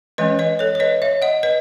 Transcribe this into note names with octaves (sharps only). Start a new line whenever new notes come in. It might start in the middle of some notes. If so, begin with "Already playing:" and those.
E3 G#3 C#4 B4 D#5
B4 D#5
A4 C#5
C#5
B4 D#5
C#5 E5
D#5 F#5
B4 D#5